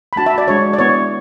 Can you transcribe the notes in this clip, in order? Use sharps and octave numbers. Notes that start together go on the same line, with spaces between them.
B5
A3 D4 F#4 A5
E5
D5
G#3 D4 F#4 C#5
D5
B3 E4 C#5